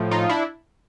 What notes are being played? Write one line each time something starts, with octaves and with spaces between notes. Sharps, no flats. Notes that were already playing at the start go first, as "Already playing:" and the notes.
Already playing: A2 F3
D#4 F4
D4 E4